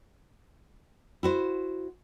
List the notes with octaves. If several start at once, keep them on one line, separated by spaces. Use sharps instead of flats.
E4 F#4 C5